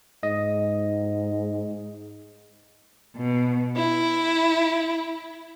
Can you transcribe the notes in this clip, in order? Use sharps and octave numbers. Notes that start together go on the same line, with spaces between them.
G#2 D#5
B2
E4